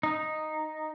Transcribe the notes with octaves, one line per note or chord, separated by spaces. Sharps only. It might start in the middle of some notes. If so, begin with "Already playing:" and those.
D#4